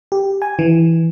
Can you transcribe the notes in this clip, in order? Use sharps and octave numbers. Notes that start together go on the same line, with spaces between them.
G4
G#5
E3